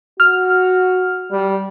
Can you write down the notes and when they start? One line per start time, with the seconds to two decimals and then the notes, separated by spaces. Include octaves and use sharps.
0.20 F#4 F6
1.31 G3